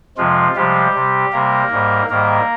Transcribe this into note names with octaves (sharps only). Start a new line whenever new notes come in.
F2 C3 F3 G#3 F4
C3 F3 G3 G#3 G4
C3 G3
C3 G3 A#3 A#4
G#2 G3
G#2 D#3 G3 A#3 A#4